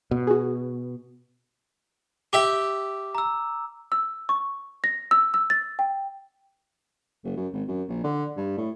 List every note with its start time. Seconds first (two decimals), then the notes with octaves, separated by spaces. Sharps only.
0.11 B2
0.27 F#4 G#4
2.33 G4 E5 D6
3.15 A#5 E6
3.92 E6
4.29 C#6
4.84 A#6
5.11 E6
5.34 E6
5.50 A6
5.79 G5
7.24 F#1
7.37 F#2
7.53 G#1
7.68 F#2
7.88 A#1
8.04 D3
8.37 G2
8.57 A2